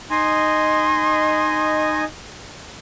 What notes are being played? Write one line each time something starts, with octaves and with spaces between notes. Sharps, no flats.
D#4 D#5 G#5 C6